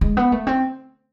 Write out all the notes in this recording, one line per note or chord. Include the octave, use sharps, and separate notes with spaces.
G#3
B3
A3
C4